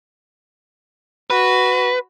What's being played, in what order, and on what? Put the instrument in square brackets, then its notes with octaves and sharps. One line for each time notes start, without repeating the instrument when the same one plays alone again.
[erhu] F#4 [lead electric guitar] B4